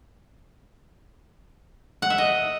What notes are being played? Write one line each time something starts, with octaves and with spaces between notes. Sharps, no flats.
F#5
E5
D#5